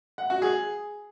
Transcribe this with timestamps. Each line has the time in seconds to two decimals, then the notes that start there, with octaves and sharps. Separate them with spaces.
0.18 F#5
0.30 F#4
0.42 G#4